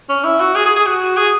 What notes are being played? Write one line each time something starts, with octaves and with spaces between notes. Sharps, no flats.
C#4
E4
F#4
G#4
G#4
G#4
F#4
G#4